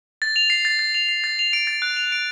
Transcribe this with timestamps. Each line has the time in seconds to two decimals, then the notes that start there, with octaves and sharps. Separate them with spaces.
0.22 A6
0.36 F7
0.50 C7
0.65 A6
0.79 A6
0.95 F7
1.09 C7
1.24 A6
1.39 F7
1.53 D7
1.67 A6
1.82 F#6
1.97 F7
2.12 D7